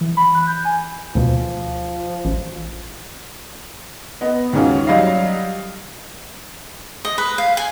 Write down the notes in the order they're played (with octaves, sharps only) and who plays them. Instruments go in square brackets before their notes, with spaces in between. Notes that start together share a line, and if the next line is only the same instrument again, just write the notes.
[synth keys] E3
B5
F#6
G6
G#5
[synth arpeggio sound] D2 B2 [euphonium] F3
[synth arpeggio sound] A1
[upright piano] B3 D#5
D#2 G#2 C#4 F4 F#4
F#3 G3 D#5 F5
[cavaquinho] D#5
B4
F5
G#5